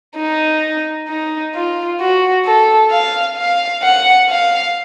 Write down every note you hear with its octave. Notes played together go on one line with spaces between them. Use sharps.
D#4
D#4
F4
F#4
A4
F5
F5
F#5
F5